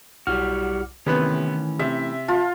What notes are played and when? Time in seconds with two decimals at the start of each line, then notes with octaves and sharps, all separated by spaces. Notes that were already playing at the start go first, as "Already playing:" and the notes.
0.27 B1 G3 E4 F#4 F6
1.06 A2 C3 D#3 E3 B3 C#4 B4
1.79 C3 E5
2.28 F4 A5